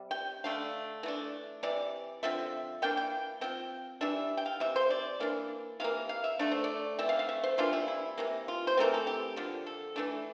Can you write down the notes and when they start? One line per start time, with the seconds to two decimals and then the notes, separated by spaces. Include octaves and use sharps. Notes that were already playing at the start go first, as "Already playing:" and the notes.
Already playing: C3 G3
0.11 G5
0.44 D3 A3 D4 F5
1.03 E3 A3 D4
1.63 C3 E3 D5
2.23 D3 F3 C4 E5
2.82 E3 A#3 D4 G5
2.97 G5
3.41 F3 C4 G5
4.01 E3 G3 D4 E5
4.37 G5
4.46 F5
4.60 C3 E3 E5
4.76 C5
4.90 D5
5.20 E3 A#3 D4
5.80 C3 E3 A#3 F5
6.09 F5
6.24 E5
6.39 D3 A3 D4 D5
6.51 C5
6.64 D5
6.99 E3 A3 C4 E5
7.09 F5
7.19 F5
7.29 E5
7.43 C5
7.58 C3 E3 A#3 D4 F4
7.73 E4
7.88 E4
8.18 C3 E3 A#3
8.48 F4
8.67 C5
8.77 E3 A3 C4 A#4
8.94 A4
9.07 G4
9.36 D3 F3 A#3
9.66 A4
9.96 E3 A3 D4